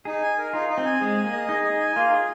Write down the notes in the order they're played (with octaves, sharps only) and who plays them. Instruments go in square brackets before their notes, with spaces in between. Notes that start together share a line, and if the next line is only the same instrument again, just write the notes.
[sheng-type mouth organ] D#4 [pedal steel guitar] G#4
[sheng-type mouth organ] G#5
A#4
[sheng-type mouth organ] D#4 [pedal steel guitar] F4
[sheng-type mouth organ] D#4
[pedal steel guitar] C4
[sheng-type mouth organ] G#5
[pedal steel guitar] G#3 [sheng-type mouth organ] G#4
[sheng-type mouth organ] G#5
[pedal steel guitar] A#3
[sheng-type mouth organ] D#5
[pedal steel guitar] D#4 [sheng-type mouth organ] G#4
[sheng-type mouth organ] G#4
G#5
[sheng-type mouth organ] A#3 [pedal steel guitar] F4
[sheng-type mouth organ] G#4